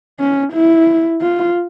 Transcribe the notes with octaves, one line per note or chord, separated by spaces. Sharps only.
C#4
E4
F4